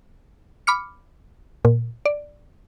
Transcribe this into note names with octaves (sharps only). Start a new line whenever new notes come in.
B5 D6 F6 C#7
A#2
D5